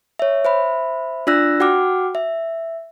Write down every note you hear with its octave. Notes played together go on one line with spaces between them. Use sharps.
C#5 E5
C5 E5 B5
D4 F4 D5 E6 F#6 A#6
F#4 F#5 G5 D6 F6
E5